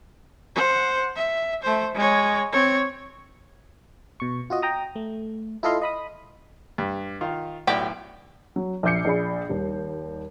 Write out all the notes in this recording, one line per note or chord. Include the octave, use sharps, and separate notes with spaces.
C5 F#5
E5
A3 C5
G#3 C#5
C4 C#5
B2 C#6
F4 F#4 D#5
G5 A#5 D#6
A3
E4 F4 A4 D#5 F5 C6
D#5 B5 D#6
G2
D#3 F4
B1 A2 F#4 G4 D5 G5
F#3
A#1 E5 D6 G6 C7 C#7
A#1 G#4 D5 B5
D#2 G3